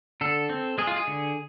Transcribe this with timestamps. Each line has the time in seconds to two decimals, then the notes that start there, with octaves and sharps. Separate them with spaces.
0.21 D3 A4
0.49 C4
0.78 G#3 G#4
0.87 F4
0.96 G#4
1.07 D3